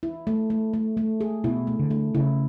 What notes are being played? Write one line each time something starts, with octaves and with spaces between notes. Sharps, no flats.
E4
A3
A3
A3
A3
G#4
B2 E4
A3
D3
A3
C#3 E4